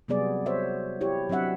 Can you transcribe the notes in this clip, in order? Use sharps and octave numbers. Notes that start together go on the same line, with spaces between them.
C3 F#3 G3 B3 G#4 D5
F#4 C5 C#5 E5
E4 G4 C#5
F#3 C4 D4 E5 F#5